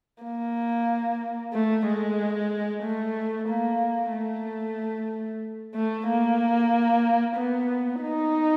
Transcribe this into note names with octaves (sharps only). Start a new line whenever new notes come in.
A#3
A3
G#3
A3
A#3
A3
A3
A#3
B3
D#4